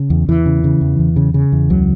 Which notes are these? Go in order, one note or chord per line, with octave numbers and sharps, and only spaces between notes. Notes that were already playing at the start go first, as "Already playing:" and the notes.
Already playing: C#3
E2
E2 E3
C#3
C#3
E2
E2
C#3
C#3
E2
C#2 F#3